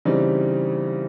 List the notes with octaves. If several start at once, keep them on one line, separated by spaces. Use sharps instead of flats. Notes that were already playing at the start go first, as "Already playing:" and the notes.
C#3 E3 G3 C4 D#4